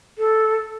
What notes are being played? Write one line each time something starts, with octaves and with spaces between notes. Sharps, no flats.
A4